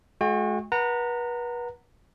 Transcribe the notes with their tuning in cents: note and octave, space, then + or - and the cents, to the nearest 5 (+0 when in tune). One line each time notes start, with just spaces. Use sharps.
G#3 +45 F#4 -25 G5 +40
B4 -35 F#5 +0 A#5 -25